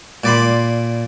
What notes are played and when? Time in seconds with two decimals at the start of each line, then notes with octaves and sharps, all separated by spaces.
0.24 A#2 D5 B5 C6